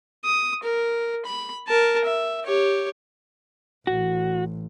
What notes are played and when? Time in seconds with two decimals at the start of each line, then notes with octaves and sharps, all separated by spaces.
0.25 D#6
0.63 A#4
1.25 B5
1.68 A#4 A5
2.05 E5
2.45 G4 C#5
3.87 A1 F#4